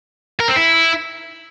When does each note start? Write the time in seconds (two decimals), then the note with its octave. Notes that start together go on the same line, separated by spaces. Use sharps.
0.40 A#4
0.49 C4
0.57 E4